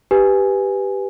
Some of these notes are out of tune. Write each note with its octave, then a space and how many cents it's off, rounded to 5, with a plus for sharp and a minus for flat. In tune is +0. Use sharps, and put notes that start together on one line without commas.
G4 +0 B4 +0 G#5 +0